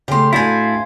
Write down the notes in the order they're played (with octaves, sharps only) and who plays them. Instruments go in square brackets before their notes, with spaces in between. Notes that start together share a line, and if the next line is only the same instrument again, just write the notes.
[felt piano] C#3 A3 [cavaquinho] G4 C6
[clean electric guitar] A2 D4 E4 [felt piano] A3 F#4 [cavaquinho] C5 G#5 [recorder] F5